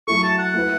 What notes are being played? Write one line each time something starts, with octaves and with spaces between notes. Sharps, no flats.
F#3 A3 E4 A4 C#6
A5
F#5
A3 E4 B4